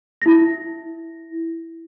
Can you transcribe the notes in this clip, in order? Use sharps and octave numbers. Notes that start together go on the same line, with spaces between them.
E4 A#6